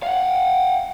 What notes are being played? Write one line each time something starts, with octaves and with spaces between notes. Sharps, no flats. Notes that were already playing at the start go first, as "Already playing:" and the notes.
F5 F#5